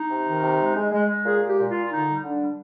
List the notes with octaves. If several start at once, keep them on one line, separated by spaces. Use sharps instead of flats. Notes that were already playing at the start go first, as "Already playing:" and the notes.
Already playing: D#4
C3
D#3
C3
G#3
G#3
G#3
G#3
A#2 G#4
G#3
G4
A#2
A#2 F4
F4
D3 D#4
G3
D3 D4
G3